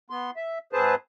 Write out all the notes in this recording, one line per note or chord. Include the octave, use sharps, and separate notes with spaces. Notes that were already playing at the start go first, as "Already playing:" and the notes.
B3 C6
E5
G#2 C4 G#4 B4 C5 A5